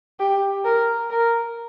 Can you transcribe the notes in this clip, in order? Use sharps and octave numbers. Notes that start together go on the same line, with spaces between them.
G4
A#4
A#4